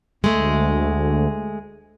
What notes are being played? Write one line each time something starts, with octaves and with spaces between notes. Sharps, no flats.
D2 G#3 A3